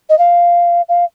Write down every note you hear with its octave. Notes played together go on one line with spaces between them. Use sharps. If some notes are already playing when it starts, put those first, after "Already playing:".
D#5
F5
F5